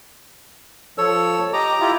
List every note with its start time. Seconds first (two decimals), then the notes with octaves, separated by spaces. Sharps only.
0.98 F3 A4 C#5 E6
1.53 G4 D#5 A#5 D6
1.80 E4 F4 G4